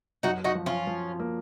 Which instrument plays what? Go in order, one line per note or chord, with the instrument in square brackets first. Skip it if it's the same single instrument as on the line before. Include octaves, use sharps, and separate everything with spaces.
[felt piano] F#2 [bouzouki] D#4 F#4
[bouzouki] D#4 F#4
[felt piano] F3
[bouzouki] C#4 F4
[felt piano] F3
A#3